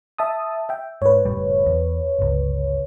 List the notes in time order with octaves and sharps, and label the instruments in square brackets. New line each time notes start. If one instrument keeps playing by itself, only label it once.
[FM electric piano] E5 A5 D#6
E5 G5
[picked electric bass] G#2 [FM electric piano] B4 C#5
[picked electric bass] F#1 A2 G3
E2
G1 C#2